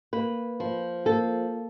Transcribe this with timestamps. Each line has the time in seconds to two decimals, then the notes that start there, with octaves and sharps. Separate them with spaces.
0.13 A#3 B4
0.60 F3
1.05 A#3 A4